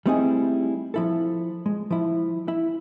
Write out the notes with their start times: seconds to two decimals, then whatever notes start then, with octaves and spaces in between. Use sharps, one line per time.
0.06 G3 A3 C4 D#4 E4 G#4
0.94 F3 E4 A4
1.66 G#3
1.91 F3 E4
2.48 E4